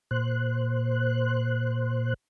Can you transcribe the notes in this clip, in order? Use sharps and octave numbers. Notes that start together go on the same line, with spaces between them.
A#2 C5 F#6